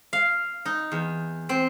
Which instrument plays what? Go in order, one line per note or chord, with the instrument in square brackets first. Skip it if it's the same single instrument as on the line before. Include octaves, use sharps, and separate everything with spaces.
[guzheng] F5
D#4
E2
C4